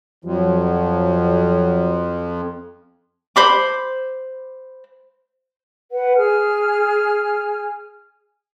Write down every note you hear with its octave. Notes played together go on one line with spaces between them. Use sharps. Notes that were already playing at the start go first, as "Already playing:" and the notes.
F2 F3 F#3
C5 B5 D6
B4 F#5
G#4 G#5 F6